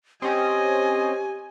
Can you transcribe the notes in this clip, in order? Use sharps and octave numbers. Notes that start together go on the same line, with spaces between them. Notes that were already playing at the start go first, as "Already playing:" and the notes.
C4 C#4 G4 D#5 G#5